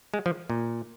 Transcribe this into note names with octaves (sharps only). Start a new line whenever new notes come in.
G#3
F3
A#2